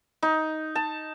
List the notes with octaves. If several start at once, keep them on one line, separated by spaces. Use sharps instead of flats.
D#4
A5